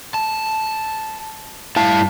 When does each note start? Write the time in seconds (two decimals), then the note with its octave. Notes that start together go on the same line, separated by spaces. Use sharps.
0.14 A5
1.76 G2 E4 F5 A5